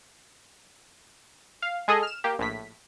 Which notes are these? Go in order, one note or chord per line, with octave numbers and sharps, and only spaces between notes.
F5
G#3 G#4 A4 D#5
F6 E7
A#3 G4
A#1 A2 B6